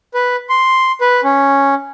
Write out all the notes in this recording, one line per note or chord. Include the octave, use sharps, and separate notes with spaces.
B4
C6
B4
C#4